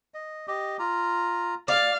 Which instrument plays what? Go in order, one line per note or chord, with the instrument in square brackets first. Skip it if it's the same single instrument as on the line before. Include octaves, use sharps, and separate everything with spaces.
[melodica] D#5
G4 D#5
F4 A#5
[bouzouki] D5 [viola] F5